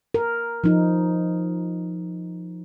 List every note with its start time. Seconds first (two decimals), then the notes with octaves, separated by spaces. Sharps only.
0.14 A#4
0.64 F3 D#4